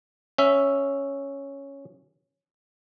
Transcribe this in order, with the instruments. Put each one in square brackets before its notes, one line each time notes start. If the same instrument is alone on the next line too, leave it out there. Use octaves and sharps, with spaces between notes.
[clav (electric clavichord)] C#4 E5